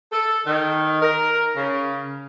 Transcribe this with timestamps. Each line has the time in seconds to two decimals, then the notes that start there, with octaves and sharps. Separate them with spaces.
0.12 A4
0.46 D#3
1.01 A#4
1.55 C#3